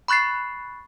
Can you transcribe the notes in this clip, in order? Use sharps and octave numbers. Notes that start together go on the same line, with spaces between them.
B5 C#6 F#6 A6 C7